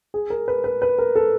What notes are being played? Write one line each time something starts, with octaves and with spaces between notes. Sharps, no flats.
G#4
A#4
B4
B4
B4
A#4
A4